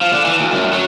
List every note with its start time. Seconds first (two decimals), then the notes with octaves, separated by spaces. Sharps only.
0.01 F3
0.13 D3
0.25 E3
0.39 D2
0.53 F#2
0.73 F#3